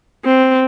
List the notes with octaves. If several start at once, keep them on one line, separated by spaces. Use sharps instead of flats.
C4